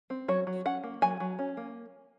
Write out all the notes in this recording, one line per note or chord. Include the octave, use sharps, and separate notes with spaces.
C4
F#3 C#5
F#3
C#4 F#5
A#3
F#3 G#5
F#3
C#4
A#3